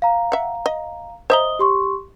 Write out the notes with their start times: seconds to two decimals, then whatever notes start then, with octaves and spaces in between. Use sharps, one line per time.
0.02 F5 A#5
0.32 E5 F#5
0.66 D#5
1.30 C5 D#5 E5 A#5 D#6 G7
1.59 G4 C6 C#6